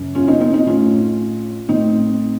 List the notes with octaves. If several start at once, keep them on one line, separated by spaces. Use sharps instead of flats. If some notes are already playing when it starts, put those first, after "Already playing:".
Already playing: F#2 C#3
C#4 F4
C4 D#4
C4 D#4
C4 D#4
A2 C#4 F4
A2 C4 D#4